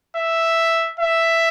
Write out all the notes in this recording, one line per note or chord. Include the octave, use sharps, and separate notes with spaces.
E5
E5